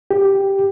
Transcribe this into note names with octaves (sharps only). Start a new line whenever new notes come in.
G4